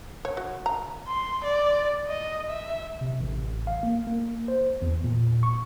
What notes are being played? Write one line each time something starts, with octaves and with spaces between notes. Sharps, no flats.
C#5
F#4
A#5
C6
D5
D#5
E5
C3
A1
F5
A#3
A#3
C5
E2
A#2
C#6